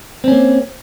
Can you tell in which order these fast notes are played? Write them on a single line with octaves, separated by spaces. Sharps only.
C4 C#4 A#3